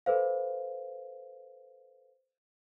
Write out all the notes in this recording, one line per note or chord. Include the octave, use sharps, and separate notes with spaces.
A4 B4 C5 F5